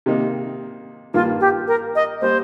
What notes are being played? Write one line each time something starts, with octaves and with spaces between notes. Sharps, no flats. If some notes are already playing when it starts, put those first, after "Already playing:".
C3 D#3 A#3 D#4
G2 D#3 A#3 F4
G4
A#4
D#5
G3 A#3 C5